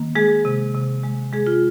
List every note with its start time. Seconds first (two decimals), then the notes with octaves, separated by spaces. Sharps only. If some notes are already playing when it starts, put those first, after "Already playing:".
Already playing: D#3 A#3
0.15 G#3 G#4
0.45 C3
0.75 C3
1.03 G#3
1.33 G#3 G#4
1.47 F4